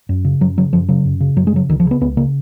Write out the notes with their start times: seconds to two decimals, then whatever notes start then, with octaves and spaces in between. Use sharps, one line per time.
0.09 F#2
0.25 C#3
0.41 F#2 F#3
0.57 C#3 F#3
0.73 F#2 F3
0.89 C#3 F#3
1.05 F#2
1.20 C#3
1.36 F#2 F#3
1.47 G#3
1.52 C#3 F#3
1.69 C#2 D#3
1.80 F3
1.85 C#3
1.91 B3
2.01 C#2 B3
2.17 C#3 A#3